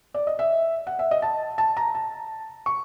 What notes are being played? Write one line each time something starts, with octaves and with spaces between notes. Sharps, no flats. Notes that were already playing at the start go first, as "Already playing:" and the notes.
D5
D#5
E5
F#5
E5
D#5
A5
A5
A#5
A5
C#6